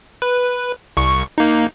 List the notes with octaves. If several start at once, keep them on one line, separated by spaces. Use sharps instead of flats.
B4
C2 C#6
A#3 D#4